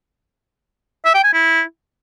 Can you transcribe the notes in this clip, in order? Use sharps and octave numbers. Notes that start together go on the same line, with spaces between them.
E5
G5
G#5
E4